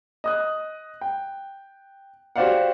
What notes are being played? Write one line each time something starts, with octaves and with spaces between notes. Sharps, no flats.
D#5 D#6 F#6
G5
F#4 G4 C5 D5 F5 F#5